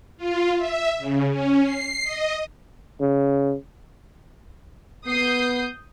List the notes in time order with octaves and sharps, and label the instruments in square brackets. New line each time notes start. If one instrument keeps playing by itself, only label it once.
[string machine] F4
E5
C#3
C#4
C7
D#5
[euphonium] C#3
[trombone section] B3 [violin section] D#6 G6 C7